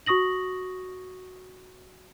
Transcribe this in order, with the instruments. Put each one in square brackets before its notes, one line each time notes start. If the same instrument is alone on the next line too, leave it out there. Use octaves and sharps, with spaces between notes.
[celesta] F#4 C#6 D#6 A#6 F#7